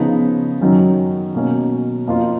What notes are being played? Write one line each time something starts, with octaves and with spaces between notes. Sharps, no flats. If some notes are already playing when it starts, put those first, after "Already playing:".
Already playing: C#3 F3 B3 D#4
F#2 D#3 F#3 C#4
B2 A#3 C#4
F2 F3 A#3 F4